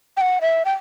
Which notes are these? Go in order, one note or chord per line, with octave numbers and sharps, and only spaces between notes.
G5
F#5
E5
G5